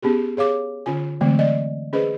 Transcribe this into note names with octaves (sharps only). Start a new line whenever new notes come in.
B3 C#4 G4 G#4
G#4 C#5 F5 D6
D3 C#4 F4 G#5
D3 E3 F#3 G#3 A3 C4
D5 D#5
C#4 G#4 B4 C5 D#5